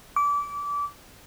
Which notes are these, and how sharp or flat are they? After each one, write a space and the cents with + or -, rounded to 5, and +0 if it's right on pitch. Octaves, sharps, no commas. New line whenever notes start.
D6 -25